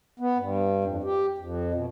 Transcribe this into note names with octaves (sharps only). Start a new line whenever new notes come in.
B3
G2
F2
G4
F2
B2